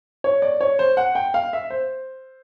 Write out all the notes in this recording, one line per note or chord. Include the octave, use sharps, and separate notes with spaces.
C#5
D5
C#5
C5
F#5
G5
F5
E5
C5